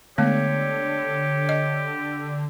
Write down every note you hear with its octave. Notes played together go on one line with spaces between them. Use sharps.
D3 G#3 A3 B3 G4 C#5
D#5